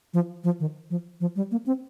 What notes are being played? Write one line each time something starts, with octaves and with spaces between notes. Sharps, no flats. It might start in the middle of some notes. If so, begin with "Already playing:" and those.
F3
F3
D#3
F3
F3
G3
A#3
C4